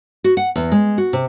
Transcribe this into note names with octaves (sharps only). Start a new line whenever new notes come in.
F#4
F#5
E2
G#3
F#4
C3